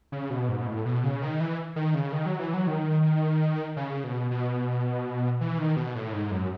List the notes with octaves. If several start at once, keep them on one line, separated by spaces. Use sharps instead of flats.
C#3
B2
G#2
B2
A2
B2
C#3
D#3
E3
D#3
C#3
D#3
F#3
E3
F#3
D#3
C#3
B2
B2
E3
D#3
B2
A2
G#2
F#2